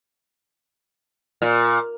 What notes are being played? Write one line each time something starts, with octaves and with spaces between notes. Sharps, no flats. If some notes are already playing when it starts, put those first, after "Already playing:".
A#2